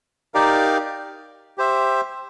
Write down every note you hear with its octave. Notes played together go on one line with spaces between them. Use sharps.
D#4 G4 A#4 D5 F5
G4 C5 E5